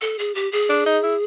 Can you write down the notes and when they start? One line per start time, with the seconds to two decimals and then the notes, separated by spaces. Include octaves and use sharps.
0.01 A4
0.19 G#4
0.35 G4
0.52 G#4
0.69 D4
0.86 D#4
1.03 E4